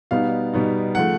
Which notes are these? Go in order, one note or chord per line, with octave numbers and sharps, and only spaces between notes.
B2 G3 B3 D#4 F5
B2 G3 B3 D#4
C#3 F3 A3 F#5